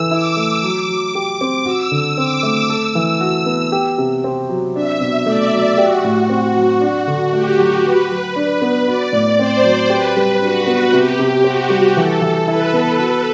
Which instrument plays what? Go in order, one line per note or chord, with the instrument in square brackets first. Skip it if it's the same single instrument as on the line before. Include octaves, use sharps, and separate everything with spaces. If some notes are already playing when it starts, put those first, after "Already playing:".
Already playing: [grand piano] E3 A4 [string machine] E6
[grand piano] E4 [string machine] D6
[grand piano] A3
F#3
F#3
G4
C4
[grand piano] F#4 [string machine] E6
[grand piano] D3
[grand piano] C4 [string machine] D6
[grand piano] A3
[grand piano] A4 [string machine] E6
[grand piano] E3
F#4
B3
G4
C3
C4
F#3
[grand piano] D4 [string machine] E5
[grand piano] B2
[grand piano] A3 [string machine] D5
[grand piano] F#3
[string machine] F#4 [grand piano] G4
[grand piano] A2
C4
F#3
[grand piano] D4 [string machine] F#4
[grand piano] D3
[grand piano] A3 [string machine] G4
[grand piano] F#3
[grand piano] F#3 [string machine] B4
[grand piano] F#3
D4
B3
[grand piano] F#4 [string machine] D5
[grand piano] A2
[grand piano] C4 [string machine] C5
[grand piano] F#3
[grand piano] G4 [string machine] B4
[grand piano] G3
[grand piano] D4 [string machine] F#4
[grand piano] B3
[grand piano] C3 [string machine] G4
[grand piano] C3
[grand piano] C4 [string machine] F#4
[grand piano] G3
[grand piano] E3 [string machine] A4
[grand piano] E3
[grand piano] E4 [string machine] B4
[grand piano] B3
F#4